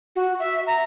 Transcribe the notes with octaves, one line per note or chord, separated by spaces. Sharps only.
F#4
E5
A#5